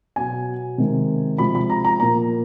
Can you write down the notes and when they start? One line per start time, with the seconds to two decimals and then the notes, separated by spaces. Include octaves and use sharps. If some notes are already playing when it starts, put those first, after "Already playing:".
0.16 B2 F#3 B3 G#5
0.78 C3 D#3 G#3
1.38 C3 F3 G#3 B5
1.55 B5
1.70 A#5
1.85 A#5
2.00 A#2 F3 A#3 A#5